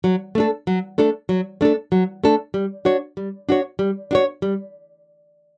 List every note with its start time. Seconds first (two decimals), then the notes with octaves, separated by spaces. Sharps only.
0.04 F#3
0.35 A3 D4 A4
0.67 F#3
0.98 A3 D4 A4
1.29 F#3
1.61 A3 D4 A4
1.92 F#3
2.24 A3 D4 A4
2.54 G3
2.85 D4 F#4 C#5
3.17 G3
3.49 D4 F#4 C#5
3.79 G3
4.11 D4 F#4 C#5
4.42 G3